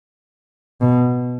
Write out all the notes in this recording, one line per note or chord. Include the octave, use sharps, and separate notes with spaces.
B2